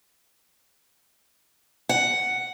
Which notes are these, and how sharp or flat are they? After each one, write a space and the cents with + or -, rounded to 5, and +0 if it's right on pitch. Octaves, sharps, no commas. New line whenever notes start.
F#5 +5